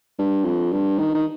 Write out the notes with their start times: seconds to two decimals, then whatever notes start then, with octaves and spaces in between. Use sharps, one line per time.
0.18 G2
0.44 F2
0.72 G2
0.98 D#3
1.14 D#3